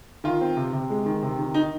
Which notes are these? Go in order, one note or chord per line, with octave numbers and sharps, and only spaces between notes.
D#3 F4
C4
C3
C3
G#3
D#3
C3
D#3
D#3 D#4